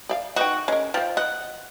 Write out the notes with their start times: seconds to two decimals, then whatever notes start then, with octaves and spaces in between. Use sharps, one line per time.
0.09 D5 E5 F5
0.36 D#4 F#4 B4 G5
0.68 G#3 C#4 A#4
0.94 F3 C5 G5
1.17 D#5 F#5